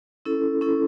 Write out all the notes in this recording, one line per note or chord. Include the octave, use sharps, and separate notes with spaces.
C#4 E4 A4
C#4 E4 A4